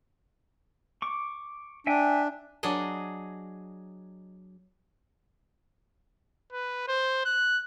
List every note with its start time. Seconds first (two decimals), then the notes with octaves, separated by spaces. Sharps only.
1.02 C#6 D6
1.87 D4 E5 G5 G#5
2.63 F#3 D4 G#4 D#5
6.53 B4
6.88 C5
7.25 F#6